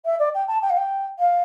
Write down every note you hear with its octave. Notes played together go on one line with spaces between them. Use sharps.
E5
D5
G5
A5
G5
F5
G5
F5